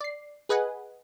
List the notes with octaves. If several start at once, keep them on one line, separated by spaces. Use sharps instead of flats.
D5 C7
G#4 B4 D#5 F#5 G#5